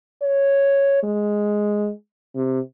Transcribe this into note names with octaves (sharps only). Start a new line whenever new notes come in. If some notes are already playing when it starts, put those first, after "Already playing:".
C#5
G#3
C3